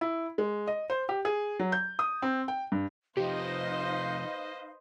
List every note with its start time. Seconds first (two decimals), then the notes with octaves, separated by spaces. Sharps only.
0.01 E4
0.38 G#3
0.67 D#5
0.90 C5
1.09 G4
1.25 G#4
1.59 F#3
1.72 G6
1.99 D#6
2.22 C4
2.48 G5
2.72 G2
3.17 C3 F3 D#4 G4 B4 C5 D#5 F5